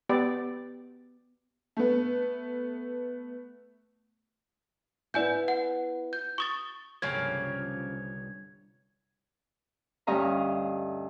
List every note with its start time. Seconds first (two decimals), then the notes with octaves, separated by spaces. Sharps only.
0.09 B3 G4 D5
1.77 A3 B3
5.14 B3 E4 D5 E5 G#5 G6
5.48 F#5
6.13 G6
6.38 C#6 D#6 A6
7.02 G1 C2 C#3 F3 A#3 C#5 G#6
10.07 D2 G2 C#4 D#5 F5 A#5